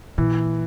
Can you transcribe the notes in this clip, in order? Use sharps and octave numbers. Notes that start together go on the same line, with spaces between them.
A#2 E3